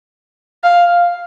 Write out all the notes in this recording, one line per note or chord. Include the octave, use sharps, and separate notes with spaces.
F5